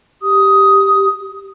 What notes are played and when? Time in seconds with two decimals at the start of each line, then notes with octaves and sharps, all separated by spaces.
0.22 G4 D#6